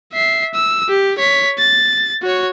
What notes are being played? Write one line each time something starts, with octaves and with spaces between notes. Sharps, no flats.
E5 C7
E6
G4
C#5 B6
A6
F#4 C#5